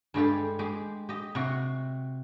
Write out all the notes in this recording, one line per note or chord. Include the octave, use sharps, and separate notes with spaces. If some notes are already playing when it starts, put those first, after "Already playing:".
G2 G#3 G4 A4
G#3 G4
G4 D#5
C3 F#4